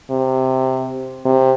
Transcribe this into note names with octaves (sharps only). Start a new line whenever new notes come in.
C3
C3